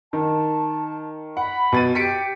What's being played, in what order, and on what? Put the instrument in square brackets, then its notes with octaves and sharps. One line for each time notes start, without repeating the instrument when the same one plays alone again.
[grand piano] D#3 [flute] A5
[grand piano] F#5 [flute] B5
[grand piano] B2 A6 D#7
[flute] G4 [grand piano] B6 C#7 D7